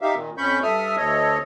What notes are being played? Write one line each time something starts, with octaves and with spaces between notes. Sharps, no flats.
D#4 G4 E5 F5
A#2 D#3
F2 C#4 B5 C#6 G6
G2 A4 E5 D#6 F6
D2 A4 C#5 D#5